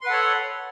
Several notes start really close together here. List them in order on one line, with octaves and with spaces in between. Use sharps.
C6 B4 F#5 A4 C#5